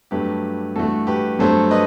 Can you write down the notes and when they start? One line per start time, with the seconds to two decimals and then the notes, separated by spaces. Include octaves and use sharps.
0.11 G2 F#3 A3 G4 B4
0.76 G2 E3 A3 F#4 A4
1.07 G4 B4
1.39 G2 F#3 A3 A4 C5
1.71 B4 D#5